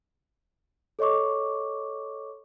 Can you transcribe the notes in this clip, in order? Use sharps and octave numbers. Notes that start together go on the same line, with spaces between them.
A4 C#5 D#5 C#6 D6